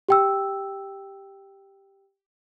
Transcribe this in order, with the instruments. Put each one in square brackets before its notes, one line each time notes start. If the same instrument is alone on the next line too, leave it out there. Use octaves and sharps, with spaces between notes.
[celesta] G4 G5 E6